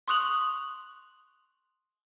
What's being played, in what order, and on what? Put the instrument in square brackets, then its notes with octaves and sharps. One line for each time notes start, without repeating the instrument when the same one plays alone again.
[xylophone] C6 C#6 D#6 F#6 F7 F#7